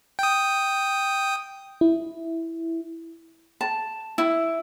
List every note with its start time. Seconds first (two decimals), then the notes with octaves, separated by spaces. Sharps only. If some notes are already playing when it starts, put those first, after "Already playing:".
0.19 G5 D#6
1.81 E4
3.61 A5
4.18 E4